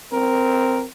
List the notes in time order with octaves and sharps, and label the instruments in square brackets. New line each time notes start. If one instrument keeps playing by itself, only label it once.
[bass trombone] C4 [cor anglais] A#4